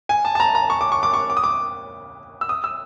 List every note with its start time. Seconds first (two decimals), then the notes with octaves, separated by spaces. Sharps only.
0.09 G#5
0.25 A5
0.35 A5
0.40 A#5
0.55 A#5
0.70 C#6
0.81 D6
0.92 C#6
1.03 D6
1.14 C#6
1.30 D6
1.37 D#6
1.44 D6
2.41 E6
2.49 D#6
2.64 E6